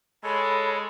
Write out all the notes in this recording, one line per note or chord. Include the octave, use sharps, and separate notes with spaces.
G#3 A4 C#5 B5